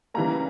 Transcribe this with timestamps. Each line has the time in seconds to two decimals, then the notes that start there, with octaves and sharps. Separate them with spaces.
0.14 C#3 E3 G3 A#3 A#5